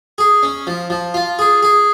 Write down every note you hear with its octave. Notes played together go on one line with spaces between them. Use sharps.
G#4
C#4
F3
F3
F4
G#4
G#4